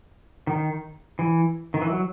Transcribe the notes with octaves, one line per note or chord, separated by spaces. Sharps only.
D#3
E3
D#3
E3
F#3